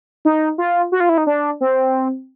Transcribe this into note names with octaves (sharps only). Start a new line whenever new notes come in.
D#4
F4
F#4
F4
E4
D#4
D4
C4